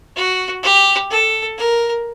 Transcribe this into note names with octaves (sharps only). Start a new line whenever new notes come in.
F#4
G4
A4
A#4